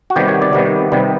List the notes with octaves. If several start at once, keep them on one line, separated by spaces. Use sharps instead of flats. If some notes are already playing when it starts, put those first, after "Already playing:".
F#4
C3 D#3 G3 B3 G4
C#5
D5
C3 D#3 G3 B3
C3 D#3 G3 B3